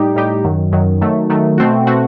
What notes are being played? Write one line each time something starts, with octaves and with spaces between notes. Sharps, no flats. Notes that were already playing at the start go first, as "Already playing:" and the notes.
Already playing: A2 G3 D#4 G4
A2 G3 D#4 G4
F#2 D#3 F#3
F#2 D#3 F#3
D#3 F#3 A3
D#3 F#3 A3
B2 A3 C4 F#4
B2 A3 C4 F#4